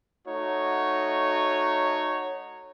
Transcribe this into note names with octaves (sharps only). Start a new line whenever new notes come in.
A3 D#4 F#4 C#5